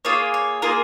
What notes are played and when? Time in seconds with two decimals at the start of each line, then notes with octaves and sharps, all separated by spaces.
0.05 A#3 F4 G#4 C#5
0.34 C#5
0.62 A#3 F4 G#4 A#4